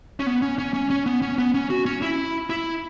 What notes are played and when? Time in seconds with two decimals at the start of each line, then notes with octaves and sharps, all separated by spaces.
0.20 C#4
0.26 B3
0.42 C#4
0.58 C#4
0.74 C#4
0.90 C#4
1.06 B3
1.22 C#4
1.38 B3
1.54 C#4
1.70 F#4
1.86 C#4
2.02 E4
2.50 E4